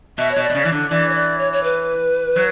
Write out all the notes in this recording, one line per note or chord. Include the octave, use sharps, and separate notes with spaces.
B2 E5
B2 C#5
D5
B2
C#3
E3
D3
E3 D5
C#5
D5
C#5
C#5
B4
F#3